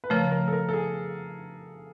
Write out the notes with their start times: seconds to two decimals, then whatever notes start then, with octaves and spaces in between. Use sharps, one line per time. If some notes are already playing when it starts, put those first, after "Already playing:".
0.04 B4
0.10 C#3 F3 A3 A#4
0.31 A#4
0.48 A4
0.53 A#4
0.69 A4
0.73 G#4